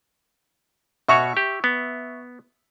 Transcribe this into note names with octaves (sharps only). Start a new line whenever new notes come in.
B2 F#4 C#5 E5 C#6
G4
B3